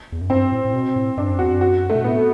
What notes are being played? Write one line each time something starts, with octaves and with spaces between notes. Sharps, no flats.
E2
F#2
G2 C4
A2
A2
B2
A2
G2 D4
F#2
E2 F#4
F#2
F#4
A3
B2
A2 B3